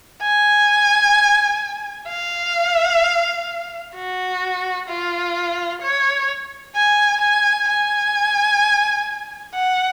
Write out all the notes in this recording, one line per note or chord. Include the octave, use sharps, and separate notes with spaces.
G#5
F5
F#4
F4
C#5
G#5
G#5
G#5
F#5